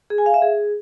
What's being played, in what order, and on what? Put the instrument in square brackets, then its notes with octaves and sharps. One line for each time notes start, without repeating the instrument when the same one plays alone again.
[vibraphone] G#4
G#5
F5
E5
G#4